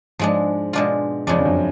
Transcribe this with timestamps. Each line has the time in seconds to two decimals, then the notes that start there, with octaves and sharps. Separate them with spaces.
0.19 G#2 F3 G#3 D4
0.73 B2 G#3 D4 F4
1.27 F2 C#3 F3 G#3 D4
1.38 F2
1.46 F#2